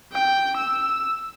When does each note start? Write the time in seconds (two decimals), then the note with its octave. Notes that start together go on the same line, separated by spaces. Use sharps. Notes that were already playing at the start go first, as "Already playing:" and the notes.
0.13 G5
0.57 E6